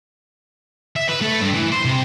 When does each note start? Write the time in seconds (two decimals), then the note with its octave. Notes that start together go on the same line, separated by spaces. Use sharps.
0.96 E5
1.09 B4
1.21 A3
1.41 G2
1.54 E3
1.72 C5
1.85 C3